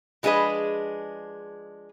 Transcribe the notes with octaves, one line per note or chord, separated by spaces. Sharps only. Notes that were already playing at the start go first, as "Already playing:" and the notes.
F3 G#3 D4 G#4 B4 D#5